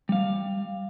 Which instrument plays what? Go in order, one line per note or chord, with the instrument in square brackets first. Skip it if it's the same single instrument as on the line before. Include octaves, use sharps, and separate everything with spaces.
[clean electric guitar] G3 F5